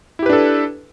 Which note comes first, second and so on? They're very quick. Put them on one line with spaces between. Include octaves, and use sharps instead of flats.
E4 G4 B4 D4 A4